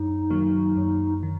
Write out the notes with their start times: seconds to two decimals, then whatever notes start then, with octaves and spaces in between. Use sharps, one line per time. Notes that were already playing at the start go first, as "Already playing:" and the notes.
Already playing: F#2 D#4
0.30 D#3 F#3 A#3
0.77 F#2
1.23 D#3